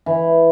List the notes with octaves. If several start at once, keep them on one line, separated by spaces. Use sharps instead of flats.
E3